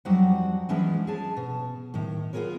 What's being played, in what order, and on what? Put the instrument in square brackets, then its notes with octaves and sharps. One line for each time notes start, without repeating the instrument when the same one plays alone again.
[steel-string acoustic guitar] F2 F#3 G3 D#4 F#4 F#5
E3 F3 G#3 C#4 D4 E4
G#4 C#5 A5
B2
A2 D#3
B3 F4 F#4 G#4 A#4 C#5